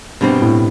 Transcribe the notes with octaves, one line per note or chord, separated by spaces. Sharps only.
G2 B2 G3 C4
A2